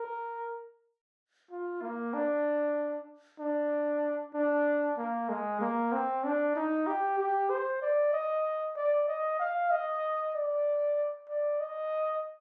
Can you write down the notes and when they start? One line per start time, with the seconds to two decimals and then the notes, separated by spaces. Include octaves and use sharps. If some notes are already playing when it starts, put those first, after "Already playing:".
Already playing: A#4
1.51 F4
1.82 A#3
2.13 D4
3.40 D4
4.34 D4
4.98 A#3
5.29 G#3
5.61 A#3
5.92 C4
6.24 D4
6.56 D#4
6.87 G4
7.19 G4
7.50 C5
7.82 D5
8.13 D#5
8.76 D5
9.08 D#5
9.39 F5
9.71 D#5
10.35 D5
11.29 D5
11.60 D#5